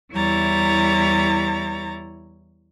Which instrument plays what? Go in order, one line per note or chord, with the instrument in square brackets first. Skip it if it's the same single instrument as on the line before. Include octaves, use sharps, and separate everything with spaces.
[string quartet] E2 G3 E4 C#5 A#5 A6